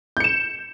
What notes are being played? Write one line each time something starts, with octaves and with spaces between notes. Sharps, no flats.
G6 C#7 E7